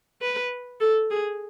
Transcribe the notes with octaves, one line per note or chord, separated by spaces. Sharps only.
B4
A4
G#4